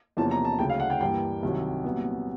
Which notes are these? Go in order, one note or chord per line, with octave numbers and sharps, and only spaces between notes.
E2 C3 F3 A#3 C#4 A5
A#5
A5
D2 C#3 F#3 G5
F5
F#5
G5
G2 E3 G3 A#3 G5
C2 C3 D#3 F#3
C2 A#2 F#3 B3